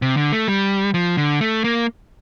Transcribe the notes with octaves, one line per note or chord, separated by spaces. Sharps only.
C3
D3
A3
G3
F3
D3
A3
A#3